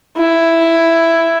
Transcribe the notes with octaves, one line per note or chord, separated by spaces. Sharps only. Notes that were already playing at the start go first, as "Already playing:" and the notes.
E4